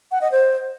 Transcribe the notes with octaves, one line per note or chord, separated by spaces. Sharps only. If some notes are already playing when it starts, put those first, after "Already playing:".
F#5
D#5
C5